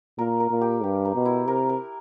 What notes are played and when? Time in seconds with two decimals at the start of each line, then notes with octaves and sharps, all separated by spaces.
0.18 A#2 A#4
0.40 A#4
0.50 A#2
0.61 G4
0.84 G2 G4
1.05 A#4
1.15 B2
1.25 E4
1.48 C3 A#4
1.69 A#4